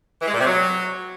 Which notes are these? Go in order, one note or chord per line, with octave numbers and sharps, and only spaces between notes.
E3
G#3
A#2
C3
F#3